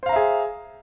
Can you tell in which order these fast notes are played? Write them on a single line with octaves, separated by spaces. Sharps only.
C5 F5 A#5 E5 G#4